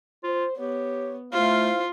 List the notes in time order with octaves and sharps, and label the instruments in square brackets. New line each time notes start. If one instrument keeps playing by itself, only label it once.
[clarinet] F4 [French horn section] C5
[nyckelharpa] B3 [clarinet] G4 [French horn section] C#5
[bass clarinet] A3 [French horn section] E4 C5 [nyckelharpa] F4 [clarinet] F5